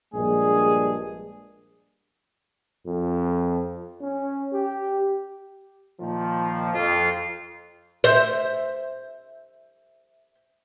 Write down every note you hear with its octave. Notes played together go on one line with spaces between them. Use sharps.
A#1 G2 G#3 D4 G#4
F2
C#4
G4
A#2 D#3 F3
F2 F4
C5 E5